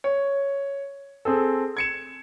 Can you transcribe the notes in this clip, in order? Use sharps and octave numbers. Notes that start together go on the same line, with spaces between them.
C#5
C4 G#4 A4
G#6 C#7 E7